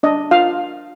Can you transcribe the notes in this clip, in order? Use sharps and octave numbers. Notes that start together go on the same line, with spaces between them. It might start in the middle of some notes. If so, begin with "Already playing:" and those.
D4 D#5
F4 F5